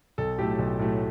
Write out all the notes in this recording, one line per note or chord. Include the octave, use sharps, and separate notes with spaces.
B1 A4
A2 F#3 A3 G4
B1
A2 F#3 A3